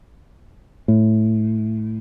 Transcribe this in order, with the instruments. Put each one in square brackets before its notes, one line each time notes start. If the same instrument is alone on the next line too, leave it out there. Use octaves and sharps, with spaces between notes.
[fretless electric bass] A2